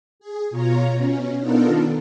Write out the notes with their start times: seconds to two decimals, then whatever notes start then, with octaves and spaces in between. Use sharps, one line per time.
0.20 G#4
0.51 B2 F4 C#5 A#5
0.93 B2 C#4
1.39 B3 D4 D#4 F4 A4 A#4
1.67 D#3